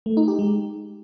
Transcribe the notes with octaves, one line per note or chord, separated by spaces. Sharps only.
A3
D#4
G4
G#3